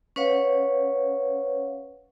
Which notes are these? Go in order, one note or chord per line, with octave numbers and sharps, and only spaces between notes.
C#4 B4 C#5 F5 F#5